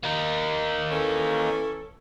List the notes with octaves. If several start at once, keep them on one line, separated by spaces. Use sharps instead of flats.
A#3 D#4
E3 C#4 A4